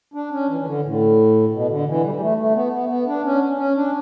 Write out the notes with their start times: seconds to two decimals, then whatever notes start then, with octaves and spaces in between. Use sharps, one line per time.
0.14 D4
0.31 C#4
0.49 E3
0.60 E3
0.65 D3
0.83 A2
1.51 B2
1.69 D3
1.86 E3
2.04 G3
2.15 G3
2.20 A3
2.38 A3
2.55 B3
2.72 B3
2.89 B3
3.07 D4
3.24 C#4
3.58 C#4
3.76 D4